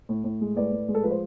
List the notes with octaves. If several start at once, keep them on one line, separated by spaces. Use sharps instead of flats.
A2
A2
G#3
A2 B4 D5
A2
G#3
A4
F3 B4
C5